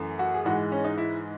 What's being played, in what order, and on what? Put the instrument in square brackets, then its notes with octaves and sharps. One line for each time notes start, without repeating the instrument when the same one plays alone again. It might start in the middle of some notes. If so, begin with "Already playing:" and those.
Already playing: [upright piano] F#2 E3 A3
F#4
G#4
G#2 E3 G#3 F#4
C#4
D#4
E4